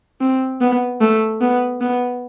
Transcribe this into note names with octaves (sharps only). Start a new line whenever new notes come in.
C4
B3
A3
B3
B3